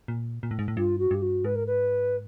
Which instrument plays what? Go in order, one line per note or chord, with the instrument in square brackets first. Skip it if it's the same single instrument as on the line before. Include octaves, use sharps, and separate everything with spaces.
[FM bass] A#2
A#2
A2
G#2
A2
[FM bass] G2 [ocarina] F4
[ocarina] F#4
[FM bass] G2 [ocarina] G4
[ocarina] F#4
[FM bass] G#2 [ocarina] B4
[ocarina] A#4
B4